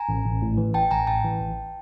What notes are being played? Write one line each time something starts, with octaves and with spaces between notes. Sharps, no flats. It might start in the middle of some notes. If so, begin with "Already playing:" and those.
Already playing: G#5 A#5
A1
A1
A2
E3
A1 G5 A5
A1 G#5 A#5
A2 G5 A5
E3
A1